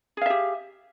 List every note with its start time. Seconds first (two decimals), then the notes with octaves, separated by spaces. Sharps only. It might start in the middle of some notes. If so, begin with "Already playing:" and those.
0.17 G#4
0.21 F5
0.26 E5
0.30 G4